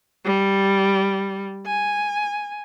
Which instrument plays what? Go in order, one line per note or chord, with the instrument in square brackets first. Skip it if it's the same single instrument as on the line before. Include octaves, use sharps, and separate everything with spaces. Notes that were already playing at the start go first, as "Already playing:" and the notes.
[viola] G3
G#5